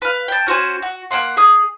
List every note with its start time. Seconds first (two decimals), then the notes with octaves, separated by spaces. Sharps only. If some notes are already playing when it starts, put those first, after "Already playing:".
0.02 B4 F5
0.28 G5 A5
0.46 C#4 F#4 C5 G#5
0.82 F#4
1.11 A#3 C#4 F#5 C6
1.37 G#4 D#6